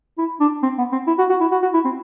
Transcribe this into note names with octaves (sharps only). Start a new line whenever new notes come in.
E4
D4
C4
B3
C4
E4
F#4
F#4
E4
F#4
F#4
E4
C4